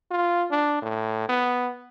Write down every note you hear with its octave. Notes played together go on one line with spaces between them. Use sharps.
F4
D4
A2
B3